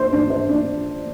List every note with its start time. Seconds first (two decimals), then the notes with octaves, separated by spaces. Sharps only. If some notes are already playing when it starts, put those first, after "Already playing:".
Already playing: D4 C5
0.13 D4
0.30 C5
0.49 D4